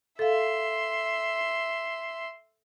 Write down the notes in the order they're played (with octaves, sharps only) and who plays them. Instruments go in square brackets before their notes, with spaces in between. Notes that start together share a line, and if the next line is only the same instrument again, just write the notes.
[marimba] A4 F5 [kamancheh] E5 C6